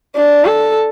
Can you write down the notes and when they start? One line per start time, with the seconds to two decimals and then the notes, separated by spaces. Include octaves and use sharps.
0.17 D4
0.45 A4